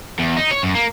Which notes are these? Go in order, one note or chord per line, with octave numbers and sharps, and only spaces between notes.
E2
D#4
C#5
F#2
A#3